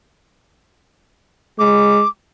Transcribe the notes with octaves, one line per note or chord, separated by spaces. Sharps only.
G#3 D6